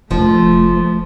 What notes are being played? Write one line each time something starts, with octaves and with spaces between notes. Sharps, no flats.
F1 F3 A3